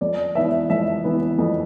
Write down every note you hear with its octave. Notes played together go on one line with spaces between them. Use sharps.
F2 D5
E3 B3 E5
F2 E5
E3 B3
F2